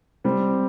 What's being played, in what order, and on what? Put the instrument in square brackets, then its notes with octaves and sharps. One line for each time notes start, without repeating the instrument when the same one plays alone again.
[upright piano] G3 C4